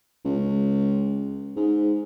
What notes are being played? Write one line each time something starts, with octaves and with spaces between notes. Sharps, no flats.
C#2
G#2